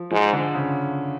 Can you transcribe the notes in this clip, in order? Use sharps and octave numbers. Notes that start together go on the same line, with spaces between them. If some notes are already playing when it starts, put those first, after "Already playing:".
Already playing: F3
G#2 F3
D3
C#3